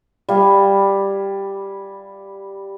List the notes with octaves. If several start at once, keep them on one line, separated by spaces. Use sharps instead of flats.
G3 F5 G#5 B5